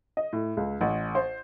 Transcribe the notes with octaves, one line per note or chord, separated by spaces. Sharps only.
D#5
A2
C#2
A1
C5